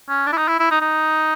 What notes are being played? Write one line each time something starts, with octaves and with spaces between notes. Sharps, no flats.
C#4
D4
E4
D#4
E4
E4
D#4
D#4